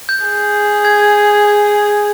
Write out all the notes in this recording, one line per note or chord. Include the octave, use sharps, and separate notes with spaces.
G6
G#4
G#6